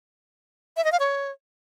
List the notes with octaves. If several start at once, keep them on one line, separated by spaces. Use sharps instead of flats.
E5
D#5
F5
C#5